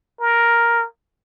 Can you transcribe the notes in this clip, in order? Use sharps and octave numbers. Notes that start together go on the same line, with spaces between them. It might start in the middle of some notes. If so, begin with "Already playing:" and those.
A#4